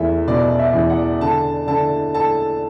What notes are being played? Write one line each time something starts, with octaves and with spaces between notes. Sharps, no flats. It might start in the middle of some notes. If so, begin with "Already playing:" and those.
Already playing: E2 A3 E5
B2 D5
E5
E2
F#5
D3 A5
D3 A5
A4 A5